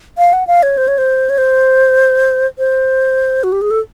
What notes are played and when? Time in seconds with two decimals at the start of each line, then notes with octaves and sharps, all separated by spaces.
0.18 F5
0.33 F#5
0.47 F5
0.63 C#5
0.77 C5
0.88 C#5
0.98 C5
1.30 C#5
1.38 C5
2.58 C5
3.44 F#4
3.52 G4
3.61 G#4
3.71 A4